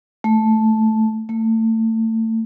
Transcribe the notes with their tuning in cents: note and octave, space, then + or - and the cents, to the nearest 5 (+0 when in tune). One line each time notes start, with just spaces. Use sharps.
A3 -5
A3 +30